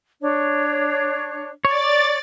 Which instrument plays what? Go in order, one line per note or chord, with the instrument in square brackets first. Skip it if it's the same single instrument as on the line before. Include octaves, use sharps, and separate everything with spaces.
[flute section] D4 C#5
[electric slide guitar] C#5 [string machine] D5 A6